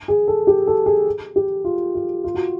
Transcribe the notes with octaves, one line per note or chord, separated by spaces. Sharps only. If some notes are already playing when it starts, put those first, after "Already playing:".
G#4
A4
G4
A4
G#4
G4
F4
F4
F4
F#4